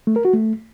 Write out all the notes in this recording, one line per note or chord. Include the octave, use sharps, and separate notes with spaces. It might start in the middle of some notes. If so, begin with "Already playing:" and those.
A3
A#4
F#4
A3